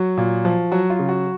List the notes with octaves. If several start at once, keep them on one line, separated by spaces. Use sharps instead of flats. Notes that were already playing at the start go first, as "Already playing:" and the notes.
Already playing: F#3 F#4
A#2
F3
F#3 F#4
F4
C#3
F#4